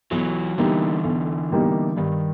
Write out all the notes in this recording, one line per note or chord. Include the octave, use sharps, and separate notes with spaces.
B1 E3 F#3
B2 D3 E3 G3 A#3 D#4
B1
B2 G3 A#3 D#4
G2 D#3